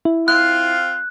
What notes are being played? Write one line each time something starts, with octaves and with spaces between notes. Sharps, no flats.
E4
C4 F4 F#6